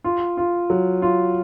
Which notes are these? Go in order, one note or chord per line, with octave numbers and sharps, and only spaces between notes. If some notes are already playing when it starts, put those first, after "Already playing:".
F4
F4
F#3
F4